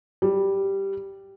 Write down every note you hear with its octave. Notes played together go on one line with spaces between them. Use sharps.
G3